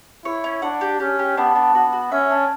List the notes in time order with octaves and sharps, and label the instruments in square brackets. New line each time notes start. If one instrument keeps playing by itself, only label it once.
[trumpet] E4 [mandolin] C#5
[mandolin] C#4
[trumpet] D4 [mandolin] F#5
[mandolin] G4
[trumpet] C#4 [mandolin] G4
[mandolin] G4
[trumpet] B3 [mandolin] D4
[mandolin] D4
[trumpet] B3 [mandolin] F#4
[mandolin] F#4
[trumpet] C#4 [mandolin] E5
[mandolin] D4